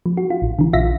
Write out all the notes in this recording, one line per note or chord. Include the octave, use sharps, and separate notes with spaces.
F3
F#4
F4
A1
D3 E3
A#1 F4 E5 A#6 B6